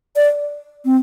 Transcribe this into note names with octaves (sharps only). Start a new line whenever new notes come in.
D5
C4